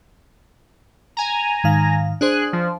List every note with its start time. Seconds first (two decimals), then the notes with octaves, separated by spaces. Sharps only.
1.17 G#5 A#5
1.64 G#2 D#3 F5
2.21 D4 G#4 C5 F#6
2.53 F3